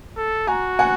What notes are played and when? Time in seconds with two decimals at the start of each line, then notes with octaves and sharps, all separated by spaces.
0.17 A4
0.47 F#4 G#5 A#5
0.79 F#5 G#5